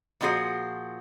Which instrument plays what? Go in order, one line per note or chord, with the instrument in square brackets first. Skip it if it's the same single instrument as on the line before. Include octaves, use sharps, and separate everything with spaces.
[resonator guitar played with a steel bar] A#2 F3 D#4 F#4 G#4 C5